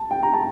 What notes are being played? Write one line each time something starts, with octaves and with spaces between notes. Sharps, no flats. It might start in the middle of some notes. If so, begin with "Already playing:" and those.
Already playing: A5
G5
A#5
A5